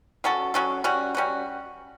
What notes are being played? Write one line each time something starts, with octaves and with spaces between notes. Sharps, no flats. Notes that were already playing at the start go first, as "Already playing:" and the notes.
F#3 C#4 F#4 A4
F#3 C#4 F#4 A4
G3 C#4 F#4
G3 C#4 F#4